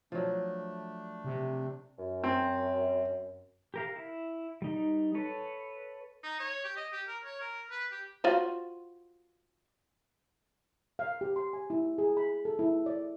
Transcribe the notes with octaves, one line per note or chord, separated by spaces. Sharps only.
F3 F#3 A3 D4
C3
F#2
C4
G4 A#4 F5
E4
G3 D#4
A4 B4 C#5
D#4
C#5
G4
D#5
G4
A#4
C#5
A#4
B4
G4
F4 F#4 C5
F5
G4
C6
G#5
E4
G#4
B5
A4
E4
D5